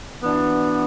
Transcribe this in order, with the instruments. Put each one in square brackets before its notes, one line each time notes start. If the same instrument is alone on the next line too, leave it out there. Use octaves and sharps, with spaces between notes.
[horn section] E3 B3 D4 F#4